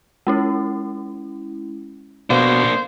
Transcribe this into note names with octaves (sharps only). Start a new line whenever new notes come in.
G#3 C#4 E4
B2 A#3 D4 C5 F5